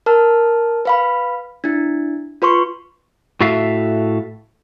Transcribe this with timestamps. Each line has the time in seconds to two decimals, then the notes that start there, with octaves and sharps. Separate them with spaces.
0.06 A#4 A5 F6
0.85 B4 F5 B5
1.64 D4 E4
2.42 F4 B4 C6 C#6
3.40 A2 F#4 A4 E5 F5